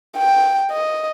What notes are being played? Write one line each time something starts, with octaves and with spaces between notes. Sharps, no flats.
G5
D#5